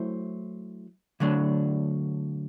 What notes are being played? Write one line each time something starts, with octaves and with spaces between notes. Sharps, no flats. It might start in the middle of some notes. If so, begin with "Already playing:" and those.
Already playing: F#3 A3 E4 C5
D3 F#3 A3 D4